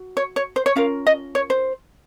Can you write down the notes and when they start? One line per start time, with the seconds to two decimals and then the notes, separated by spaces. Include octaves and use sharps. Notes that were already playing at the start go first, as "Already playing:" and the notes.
Already playing: F#4
0.17 C#5
0.36 C#5
0.56 C5
0.66 C#5
0.76 C#4 F4 A#4 F5
1.07 D#5
1.35 C#5
1.50 C5